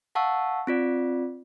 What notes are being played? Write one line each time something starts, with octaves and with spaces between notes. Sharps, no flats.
F5 F#5 A5 C#6 E6
C4 F4 D5